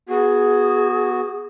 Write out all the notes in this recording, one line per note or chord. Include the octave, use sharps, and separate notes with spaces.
B3 F#4 G#4